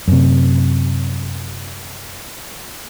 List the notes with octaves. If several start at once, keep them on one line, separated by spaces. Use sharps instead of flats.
F#2 C3